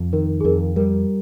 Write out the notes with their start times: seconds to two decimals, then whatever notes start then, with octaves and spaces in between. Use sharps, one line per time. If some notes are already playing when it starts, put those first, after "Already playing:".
Already playing: F2
0.13 D#3 A#4
0.40 G#4
0.44 F2 A#4
0.76 G3 A#4